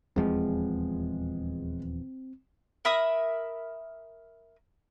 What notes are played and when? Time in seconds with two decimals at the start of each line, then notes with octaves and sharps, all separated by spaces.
0.16 D#1 E2 F3 G#3 C4
2.85 A#4 E5 B5 D#6